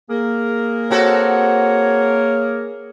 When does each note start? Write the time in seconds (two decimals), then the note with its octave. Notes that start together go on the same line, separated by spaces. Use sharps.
0.10 A#3 G#4 A#4
0.91 C4 F#4 A4 C#5